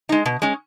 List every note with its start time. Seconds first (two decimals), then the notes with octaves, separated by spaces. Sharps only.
0.09 G#3 D#4
0.26 B2
0.42 G#3 C#4